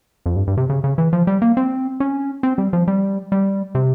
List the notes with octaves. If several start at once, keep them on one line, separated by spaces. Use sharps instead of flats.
F2
G2
G2
C3
C#3
C#3
E3
F3
G3
A#3
C4
C#4
C4
G3
F3
G3
G3
C3